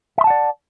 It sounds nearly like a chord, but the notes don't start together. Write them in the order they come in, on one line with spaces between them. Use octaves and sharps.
E5 C6 A5 F#5 D5